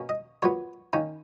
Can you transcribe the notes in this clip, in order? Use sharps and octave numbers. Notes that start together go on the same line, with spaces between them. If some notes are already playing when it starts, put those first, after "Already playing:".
Already playing: B2 A#3 C#4
D#5
A#2 F#3 B3 C#5
D#3 A#3 C#4